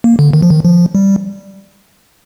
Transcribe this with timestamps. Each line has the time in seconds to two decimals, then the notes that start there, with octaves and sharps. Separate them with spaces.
0.04 A#3
0.19 D3
0.33 D#3
0.42 F3
0.51 D#3
0.65 F3
0.95 G3